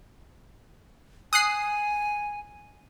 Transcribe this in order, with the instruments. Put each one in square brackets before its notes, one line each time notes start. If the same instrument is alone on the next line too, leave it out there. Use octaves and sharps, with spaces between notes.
[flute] G#5 [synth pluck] D#6 F#6 C7